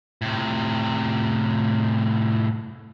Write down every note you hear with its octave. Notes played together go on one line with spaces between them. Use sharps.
A2 C3